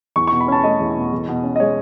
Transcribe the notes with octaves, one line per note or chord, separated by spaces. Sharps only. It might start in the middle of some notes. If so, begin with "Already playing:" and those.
E2 C#6
C#6
B2
B5
C#4 A5
A3 D#5
E2
B2
E2
B2
C#4
D#5
G#3 C#5